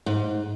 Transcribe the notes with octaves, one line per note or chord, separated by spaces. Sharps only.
G#2